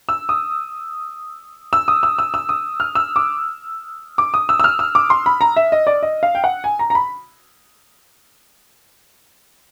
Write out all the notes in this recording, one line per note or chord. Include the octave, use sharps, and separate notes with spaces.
E6
D#6
E6
D#6
E6
E6
E6
D#6
F6
E6
D6
D6
D#6
E6
E6
F6
E6
D6
C6
B5
A#5
E5
D#5
D5
D#5
F5
G5
F#5
G#5
A#5
A#5
B5